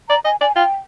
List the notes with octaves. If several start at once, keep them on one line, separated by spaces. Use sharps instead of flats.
D5 A#5
D#5 G#5
D5 G#5
F4 G5